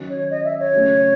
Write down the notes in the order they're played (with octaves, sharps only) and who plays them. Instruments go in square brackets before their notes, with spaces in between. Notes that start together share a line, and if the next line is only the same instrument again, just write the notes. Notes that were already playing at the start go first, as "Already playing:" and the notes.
Already playing: [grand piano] D#3 F#3 C#4
[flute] C#5
D#5
E5
C#5
[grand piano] C#3 F#3 A3 C#4